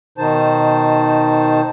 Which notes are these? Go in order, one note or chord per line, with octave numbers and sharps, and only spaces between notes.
B2 D#3 D#4 C5 A5